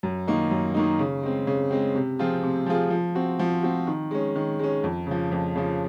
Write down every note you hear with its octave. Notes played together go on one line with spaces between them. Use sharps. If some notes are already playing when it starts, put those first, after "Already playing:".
F#2
D#3 A#3 D#4
F#2
D#3 A#3 D#4
C#3
G#3 C4
C#3
G#3 C4
C3
F3 C4 F4 G#4
C3
F3 C4 F4 G#4
F3
C4 F#4
F3
C4 F#4
D#3
G#3 C#4
D#3
G#3 C#4
F2
C#3 F3
F2
C#3 F3